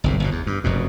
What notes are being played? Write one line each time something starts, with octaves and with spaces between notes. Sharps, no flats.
G1 C2 G#2
G1 B2
E2
G2
F1 F#2 B2